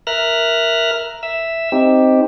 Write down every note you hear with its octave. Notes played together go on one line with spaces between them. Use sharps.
A#4 E5 F6 F#6 A#6
E5 E6
C4 D#4 G4